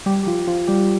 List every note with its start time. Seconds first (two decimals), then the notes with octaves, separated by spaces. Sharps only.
0.06 G3 G4
0.23 G4
0.26 F3 F4
0.47 F3 F4
0.67 G3 G4